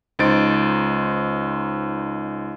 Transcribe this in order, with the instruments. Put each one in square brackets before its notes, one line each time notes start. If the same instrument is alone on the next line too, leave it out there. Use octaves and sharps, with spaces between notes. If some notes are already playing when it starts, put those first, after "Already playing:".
[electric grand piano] C#2 D#4 C5 A6 D7